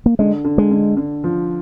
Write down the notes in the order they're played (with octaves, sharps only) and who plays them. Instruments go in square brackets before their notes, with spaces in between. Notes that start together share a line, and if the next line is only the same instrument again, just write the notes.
[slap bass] A#3
[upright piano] D3 [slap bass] G#3
[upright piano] D3
[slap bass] G#3
[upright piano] D3
D3
F3